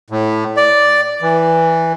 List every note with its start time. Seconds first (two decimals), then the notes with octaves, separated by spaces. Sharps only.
0.10 A2
0.57 D5
1.22 E3